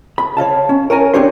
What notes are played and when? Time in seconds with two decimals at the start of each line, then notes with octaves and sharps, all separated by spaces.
0.18 B5
0.37 C#5 D#5 F5 A5
0.69 C#4
0.90 A#4 C#5 G#5 A#5
1.14 C4 D4 G4 C#5 C6